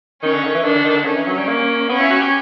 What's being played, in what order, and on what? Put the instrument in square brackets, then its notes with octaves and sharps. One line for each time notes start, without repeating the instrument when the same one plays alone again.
[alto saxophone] D#3 [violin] C#4
[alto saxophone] D3
D#3
E3
[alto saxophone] D#3 [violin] D4
[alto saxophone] D3
D#3
D3
[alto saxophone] D#3 [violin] C#4
[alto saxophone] E3
F#3
G3
A#3
[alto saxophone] B3 [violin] C#4
[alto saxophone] E4
F#4
G4